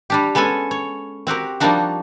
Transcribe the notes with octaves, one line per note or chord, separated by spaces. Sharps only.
G3 D4 G4
G#3 B3 C#4 A4 G#5
C#5
C4 F#4 G4 A#4
F3 G3 A#3 D4 D#4 F#4